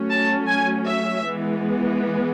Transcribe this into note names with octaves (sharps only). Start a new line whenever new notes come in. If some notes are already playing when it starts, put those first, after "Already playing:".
Already playing: F#3 A3 C#4
A5
G#5
E5
E3 G#3 B3